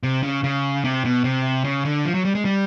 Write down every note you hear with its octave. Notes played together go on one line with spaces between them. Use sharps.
C3
C#3
C#3
C3
B2
C3
C#3
D3
F3
F#3
G3
G#3
G3